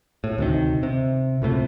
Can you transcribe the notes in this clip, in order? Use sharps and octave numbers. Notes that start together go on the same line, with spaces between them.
A2
D2 C3 D#3
C3
C#2 A2 C3 A3